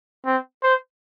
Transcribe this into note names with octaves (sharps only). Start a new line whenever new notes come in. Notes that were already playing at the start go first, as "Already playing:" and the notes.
C4
C5